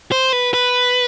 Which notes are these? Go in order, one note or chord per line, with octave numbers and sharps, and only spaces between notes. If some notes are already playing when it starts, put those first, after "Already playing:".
C5
B4
B4